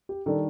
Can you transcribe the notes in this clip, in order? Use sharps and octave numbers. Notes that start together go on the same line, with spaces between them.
G4
D#3 G3 D4 A4